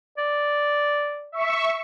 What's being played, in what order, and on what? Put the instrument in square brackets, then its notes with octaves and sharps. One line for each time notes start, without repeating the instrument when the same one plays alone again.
[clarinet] D5
[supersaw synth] E5 C#6